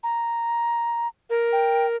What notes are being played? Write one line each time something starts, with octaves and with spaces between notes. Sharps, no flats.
A#5
A#4
G5